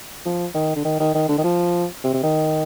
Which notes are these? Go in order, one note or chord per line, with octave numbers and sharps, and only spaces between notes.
F3
D#3
D3
D#3
D#3
D#3
D3
D#3
F3
C3
C3
D#3